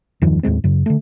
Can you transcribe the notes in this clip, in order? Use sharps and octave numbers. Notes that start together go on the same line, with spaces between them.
E2 G2 D#3 F3
D#2 A2 G#3 C4
F#2 C#3
D3 A3